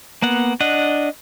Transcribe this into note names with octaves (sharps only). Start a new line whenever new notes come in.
A#3 B3 F#5
D4 D#5 F#5